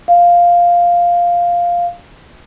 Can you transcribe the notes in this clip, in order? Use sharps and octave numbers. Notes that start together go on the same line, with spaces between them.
F5